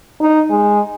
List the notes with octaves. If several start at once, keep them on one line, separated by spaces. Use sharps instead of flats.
D#4
G#3